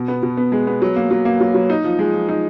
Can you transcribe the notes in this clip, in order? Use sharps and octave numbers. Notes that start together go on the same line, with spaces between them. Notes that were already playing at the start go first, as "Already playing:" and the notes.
Already playing: B2
B3
B2
B3
G#3
B3
F#3
A#3
F#3
A#3
F#3
F#3
D#4
F3
G#3
F3
D#4